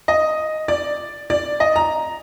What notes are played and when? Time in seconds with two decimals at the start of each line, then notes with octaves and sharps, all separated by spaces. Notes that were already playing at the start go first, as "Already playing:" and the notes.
0.08 D#5
0.68 D5
1.30 D5
1.60 D#5
1.76 A#5